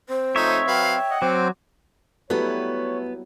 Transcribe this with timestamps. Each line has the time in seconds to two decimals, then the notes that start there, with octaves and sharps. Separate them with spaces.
0.09 C4 C5
0.36 F3 A3 D#4 C#5 E5
0.67 F#3 B4 F5 G5
1.10 D#5 F#5
1.22 F#3 C4 C5 D6
2.30 F#3 G3 A3 B3 E4 B4 C#5